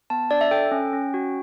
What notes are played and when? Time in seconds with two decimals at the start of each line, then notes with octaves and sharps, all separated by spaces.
0.10 B3 A5
0.31 D4 D5
0.41 E5
0.51 A4 G5
0.71 C#4
0.93 C#4
1.14 F#4